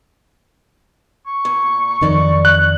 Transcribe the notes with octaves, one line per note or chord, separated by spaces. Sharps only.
C#6
A#2
F2 D#3 F#3 D5 D#5
F#6